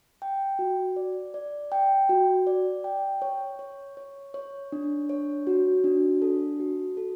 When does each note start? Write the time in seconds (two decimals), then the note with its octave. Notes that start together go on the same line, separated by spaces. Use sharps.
0.22 G5
0.59 F#4
0.96 D5
1.34 D5
1.72 G5
2.09 F#4
2.47 D5
2.84 G5
3.22 C#5
3.59 C#5
3.97 C#5
4.34 C#5
4.72 D4
5.09 C#5
5.47 F#4
5.84 D4
6.22 A4
6.60 F#4
6.97 A4